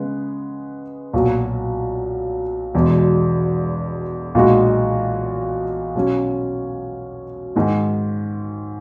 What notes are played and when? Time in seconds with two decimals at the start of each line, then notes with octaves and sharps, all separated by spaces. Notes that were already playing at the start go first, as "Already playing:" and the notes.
Already playing: C#3 G#3 B3
1.13 B1 A#2 F#3
2.74 E1 E2 B2 G#3
4.35 B1 A#2 G#3 D#4 F#4
5.95 B2 F#3 C#4
7.56 G#2 D#3 G#3